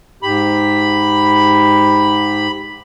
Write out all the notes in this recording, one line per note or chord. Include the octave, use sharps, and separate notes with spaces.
G#2 G4 B5